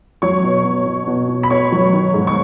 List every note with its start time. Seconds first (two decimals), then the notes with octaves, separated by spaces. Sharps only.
0.22 F#3 C#5 C#6
0.44 B2
0.65 B2
0.86 B2
1.07 B2
1.28 B2
1.43 B5
1.50 B2 C#5 C#6
1.72 F#3
1.94 D#3
2.14 G#2
2.27 C#6